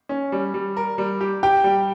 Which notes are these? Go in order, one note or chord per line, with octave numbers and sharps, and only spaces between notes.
C#4
G3
G3
A#4
G3
G4
G4 G5
G3